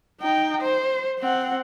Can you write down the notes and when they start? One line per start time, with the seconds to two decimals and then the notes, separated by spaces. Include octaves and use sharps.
0.21 D#4 G5
0.62 C5
1.19 C4 F#5